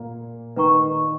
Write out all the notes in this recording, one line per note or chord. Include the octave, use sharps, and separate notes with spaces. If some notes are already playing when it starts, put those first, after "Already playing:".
Already playing: A#2 A#3
D#3 D#4 B4 G5 A#5 C#6